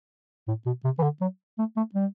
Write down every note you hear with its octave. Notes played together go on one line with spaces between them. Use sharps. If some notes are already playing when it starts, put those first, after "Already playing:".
A2
B2
C3
E3
D3
F#3
A3
A3
G3